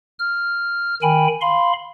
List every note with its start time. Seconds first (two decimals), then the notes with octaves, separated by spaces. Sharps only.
0.19 F6
1.02 D#3 G5 G#5 B5
1.41 F5 B5 C6